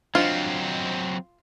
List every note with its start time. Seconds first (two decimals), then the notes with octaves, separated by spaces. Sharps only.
0.15 F#3 C4 D4 F4 C5 D#5